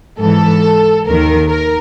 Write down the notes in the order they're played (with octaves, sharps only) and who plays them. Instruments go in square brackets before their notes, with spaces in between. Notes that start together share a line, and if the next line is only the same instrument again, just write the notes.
[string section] G#2 E3 A4
D#2 D#3 A#4
A#4